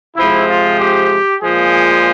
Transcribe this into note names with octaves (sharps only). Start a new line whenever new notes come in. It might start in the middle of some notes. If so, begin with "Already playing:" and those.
C3 F3 G#3 E4
F4
G4
A#2 F3 G#3 G#4